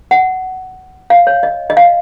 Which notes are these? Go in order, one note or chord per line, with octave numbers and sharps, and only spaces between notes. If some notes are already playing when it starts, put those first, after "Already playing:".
F#5
F5
C#5
D#5
D#5
F5